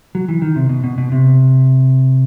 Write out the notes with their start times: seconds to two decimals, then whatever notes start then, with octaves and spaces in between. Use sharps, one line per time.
0.15 F#3
0.28 E3
0.42 D#3
0.56 C3
0.69 B2
0.84 B2
0.98 B2
1.12 C3